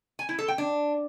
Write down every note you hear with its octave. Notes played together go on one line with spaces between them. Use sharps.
G#5
E4
A4
G5
D4